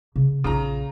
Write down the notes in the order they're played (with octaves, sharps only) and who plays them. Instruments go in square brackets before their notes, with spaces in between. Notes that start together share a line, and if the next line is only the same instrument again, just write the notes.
[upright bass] C#3
[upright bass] A#1 F4 [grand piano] C#3 A#5